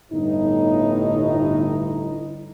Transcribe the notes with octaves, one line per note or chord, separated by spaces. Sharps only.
G1 A2 D#4